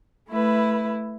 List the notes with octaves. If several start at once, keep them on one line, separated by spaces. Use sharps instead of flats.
A3 E4 B4